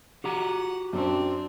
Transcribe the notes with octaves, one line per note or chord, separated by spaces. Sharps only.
F#4 G4 F#5 A#5
F#2 C4 D4